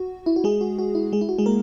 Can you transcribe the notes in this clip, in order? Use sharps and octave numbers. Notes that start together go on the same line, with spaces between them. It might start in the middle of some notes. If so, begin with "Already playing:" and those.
Already playing: F#4
E4
F#4
G#3 G#4
F#4
F#4
E4
G#3 G#4
E4
F#4
G#3 G#4
A#3 A#4